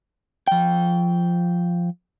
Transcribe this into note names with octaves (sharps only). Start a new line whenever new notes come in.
F3 G5